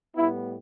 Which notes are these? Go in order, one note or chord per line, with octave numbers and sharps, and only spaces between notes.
A2 G3 B3 E4